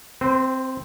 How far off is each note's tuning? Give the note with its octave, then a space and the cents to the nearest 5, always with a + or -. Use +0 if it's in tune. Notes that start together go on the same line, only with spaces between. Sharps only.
C4 +0 C5 -40